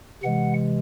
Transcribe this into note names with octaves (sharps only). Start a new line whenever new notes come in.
C3 E3 G#3 F#5